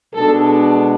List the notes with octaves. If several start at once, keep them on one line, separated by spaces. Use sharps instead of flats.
B2 G#3 D4 A4